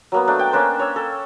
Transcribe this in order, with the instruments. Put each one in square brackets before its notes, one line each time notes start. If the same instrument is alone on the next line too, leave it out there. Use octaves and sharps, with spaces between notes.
[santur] F#3 A#3 B3
A3 D4
G5
A#3 C#4 D4 C5
C#5 E6
A4